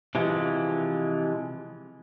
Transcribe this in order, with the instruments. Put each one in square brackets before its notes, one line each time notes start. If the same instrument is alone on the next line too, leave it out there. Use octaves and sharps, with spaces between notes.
[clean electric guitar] C3 E3 F3 G#3